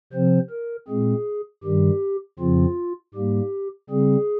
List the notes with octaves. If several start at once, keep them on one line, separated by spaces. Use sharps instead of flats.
C3 F3 C4 C5
A#4
A#2 G#3 C4 G#4
G2 D#3 G3 G4
F2 C#3 F3 C4 F4
G#2 G3 A#3 G4
C#3 G3 C4 G#4